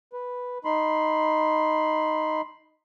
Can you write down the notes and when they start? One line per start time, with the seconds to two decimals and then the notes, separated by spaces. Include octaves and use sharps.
0.13 B4
0.65 D#4 B5 C6